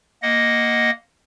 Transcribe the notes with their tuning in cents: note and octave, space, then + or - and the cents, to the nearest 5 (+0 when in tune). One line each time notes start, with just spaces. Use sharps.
A#3 +0 D#5 +0 F#5 +0